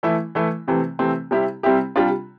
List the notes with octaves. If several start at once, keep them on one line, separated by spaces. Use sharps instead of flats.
E3 A3 E4
E3 A3 E4
C3 E3 A3 C4
C3 E3 A3 C4
C3 G3 C4 E4 G4
C3 G3 C4 E4 G4
C3 G3 D4 F4